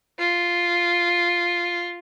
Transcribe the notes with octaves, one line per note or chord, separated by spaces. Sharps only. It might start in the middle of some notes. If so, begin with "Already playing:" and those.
F4